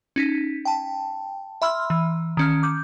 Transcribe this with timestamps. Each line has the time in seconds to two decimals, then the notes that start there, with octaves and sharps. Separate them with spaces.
0.16 C#4 D#4 B6
0.65 G5 A5
1.62 E5 B5 C6 E6 F6
1.90 E3
2.37 D#3 C#4 F6
2.63 D6 G6